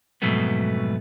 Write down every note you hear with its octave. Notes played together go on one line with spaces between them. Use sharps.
F2 G#2 B2 F#3 A3 B3